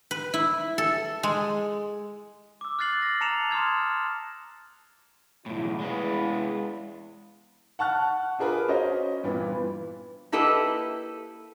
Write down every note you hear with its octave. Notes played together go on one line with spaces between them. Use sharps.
B4
E4
A4
G#3
D6 E6
F6 F#6 A6 C7 F#7
A#6
A5 A#5 C#7 E7 F7
C6 D#6 F6 G#6
B1 E2 A2 E4
G#3 B4
F#5 A5 C#6 F6 F#6
D4 F4 G#4 A#4 B4
C#4 F#4 C5 D#5
G2 A#2 E3 B3
A#3 E4 G4 A4 B4 D#5